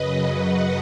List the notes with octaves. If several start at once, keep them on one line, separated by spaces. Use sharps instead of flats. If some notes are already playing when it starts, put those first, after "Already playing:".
Already playing: F#2 C#3 F#3 B4 D#5
D#5 F#5